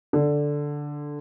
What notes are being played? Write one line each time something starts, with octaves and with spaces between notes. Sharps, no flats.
D3